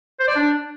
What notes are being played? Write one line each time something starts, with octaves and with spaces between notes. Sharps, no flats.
C5
D5
D4